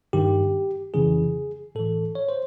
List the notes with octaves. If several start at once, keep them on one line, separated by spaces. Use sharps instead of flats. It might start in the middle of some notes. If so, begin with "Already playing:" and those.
G2 D#3 G4
F2 C#3 E3 G#4
A2 E3 A4
C#5
C5